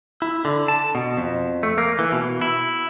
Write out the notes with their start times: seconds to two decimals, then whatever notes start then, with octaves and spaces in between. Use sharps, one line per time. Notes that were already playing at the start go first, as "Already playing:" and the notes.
0.22 E4
0.45 D3
0.68 A5
0.95 B2
1.17 F2
1.63 A3
1.78 A#3
1.99 E3
2.12 B2
2.41 E4